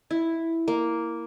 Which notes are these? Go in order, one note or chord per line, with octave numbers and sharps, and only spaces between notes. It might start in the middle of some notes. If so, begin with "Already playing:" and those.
E4
A#3